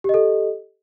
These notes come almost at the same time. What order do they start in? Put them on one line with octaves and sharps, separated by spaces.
G4 D#5 A4